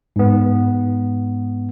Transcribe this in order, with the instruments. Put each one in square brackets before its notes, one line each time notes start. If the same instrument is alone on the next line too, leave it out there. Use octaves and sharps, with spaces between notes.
[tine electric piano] G#2 B3